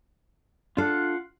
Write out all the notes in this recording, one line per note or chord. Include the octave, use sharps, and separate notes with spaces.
D4 F4 A4 F5 F#5